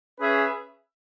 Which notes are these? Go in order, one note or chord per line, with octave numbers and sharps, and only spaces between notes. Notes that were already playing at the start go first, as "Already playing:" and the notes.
C#4 G#4 B4 E5